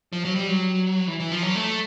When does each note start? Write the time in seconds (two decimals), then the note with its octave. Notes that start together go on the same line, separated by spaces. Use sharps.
0.13 F3
0.25 F#3
0.36 G3
0.47 F#3
1.08 E3
1.20 E3
1.32 F3
1.42 F#3
1.55 A3